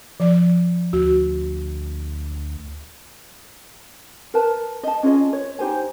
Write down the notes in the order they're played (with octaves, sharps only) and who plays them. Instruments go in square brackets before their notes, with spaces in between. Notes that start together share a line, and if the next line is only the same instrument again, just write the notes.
[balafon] F3 D5
[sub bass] D2 [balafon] F#4
[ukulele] A#4 B4 A5
D#5 A5
C#4 F4 G#4 D#5
C#5
D#4 G4 C5 G#5